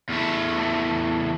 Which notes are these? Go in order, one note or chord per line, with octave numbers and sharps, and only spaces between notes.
E2 A3